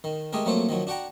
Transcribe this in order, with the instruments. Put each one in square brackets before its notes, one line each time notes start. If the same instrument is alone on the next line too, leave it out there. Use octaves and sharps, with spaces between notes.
[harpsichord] D#3
G#3 A3 G4 G#4 A#4
F2 F#3 A3 A#3 C5 C#5
D#3 F3 F#3
D4 F#4 F#5 G5 A#5